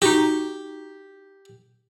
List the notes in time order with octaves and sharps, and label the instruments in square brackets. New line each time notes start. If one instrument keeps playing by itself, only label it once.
[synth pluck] D#4 F#4 [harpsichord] G4